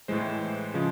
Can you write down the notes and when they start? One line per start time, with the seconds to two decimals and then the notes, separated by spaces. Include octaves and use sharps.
0.08 A2 E3 G#3 C5
0.74 C#3 F3 G#3